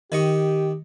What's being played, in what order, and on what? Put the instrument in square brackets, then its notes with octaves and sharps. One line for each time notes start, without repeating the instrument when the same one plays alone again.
[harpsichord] D#3 D#5 C#6 [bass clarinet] G4